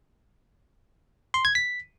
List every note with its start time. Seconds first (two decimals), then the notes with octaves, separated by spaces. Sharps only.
1.34 C6
1.45 G#6
1.55 B6